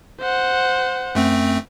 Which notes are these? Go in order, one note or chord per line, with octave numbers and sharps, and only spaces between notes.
C5 F#5
F#2 A3 C4